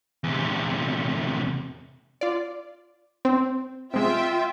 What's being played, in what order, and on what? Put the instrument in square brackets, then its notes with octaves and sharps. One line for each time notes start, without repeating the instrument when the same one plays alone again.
[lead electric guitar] E2 C3
[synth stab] F4 D5
C4
[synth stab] C3 G#3 [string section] F4 E5 G5